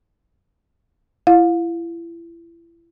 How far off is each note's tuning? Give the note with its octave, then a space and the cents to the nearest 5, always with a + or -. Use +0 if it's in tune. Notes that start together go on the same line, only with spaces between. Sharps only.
E4 +30 F5 +30